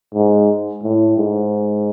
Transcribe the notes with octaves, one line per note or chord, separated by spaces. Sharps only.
G#2
A2
G#2